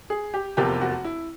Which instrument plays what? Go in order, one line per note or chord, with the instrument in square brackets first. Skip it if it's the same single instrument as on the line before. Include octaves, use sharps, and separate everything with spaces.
[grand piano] G#4
G4
F1 E2 C3 F3 A#3 G4
F#4
E4